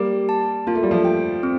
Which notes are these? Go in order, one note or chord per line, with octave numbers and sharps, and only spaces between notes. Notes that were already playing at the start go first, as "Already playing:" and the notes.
Already playing: G3 A#3 G4
A5
A#3 F4
A3
G3
F3 A3
G5
C4